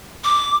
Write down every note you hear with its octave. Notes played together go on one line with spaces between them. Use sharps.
D6